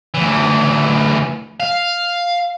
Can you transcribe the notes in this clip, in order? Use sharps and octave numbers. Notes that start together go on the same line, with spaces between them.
D2 E3
F5